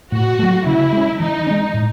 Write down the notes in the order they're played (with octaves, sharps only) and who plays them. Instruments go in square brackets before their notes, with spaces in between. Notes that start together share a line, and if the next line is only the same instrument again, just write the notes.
[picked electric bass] A2 [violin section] F#4
[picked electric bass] F#3 A3
[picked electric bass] C#3 [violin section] E4
[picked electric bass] G#3 C#4
[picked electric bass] E3 [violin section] D#4
[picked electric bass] C#4
G#3
A2